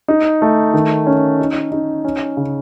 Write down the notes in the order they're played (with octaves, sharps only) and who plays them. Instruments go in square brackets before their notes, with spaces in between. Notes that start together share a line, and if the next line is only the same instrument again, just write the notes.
[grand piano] D#4
A3
D#3
C#4
D#4
D#4
C#4
C#3